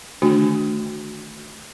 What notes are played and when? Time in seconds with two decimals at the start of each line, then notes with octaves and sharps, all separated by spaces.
0.22 D3 D#3 A3 D4 F#4 G#5